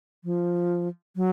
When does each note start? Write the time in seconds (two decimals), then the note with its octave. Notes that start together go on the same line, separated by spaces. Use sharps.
0.24 F3
1.16 F#3